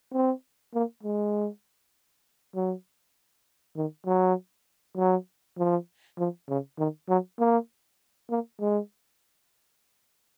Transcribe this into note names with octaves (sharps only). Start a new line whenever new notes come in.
C4
A#3
G#3
F#3
D#3
F#3
F#3
F3
F3
C#3
D#3
F#3
A#3
A#3
G#3